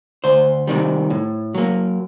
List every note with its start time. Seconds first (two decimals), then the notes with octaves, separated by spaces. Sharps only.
0.24 D2 C5
0.67 C3 D#3 G3
1.10 A2
1.55 F#3 A#3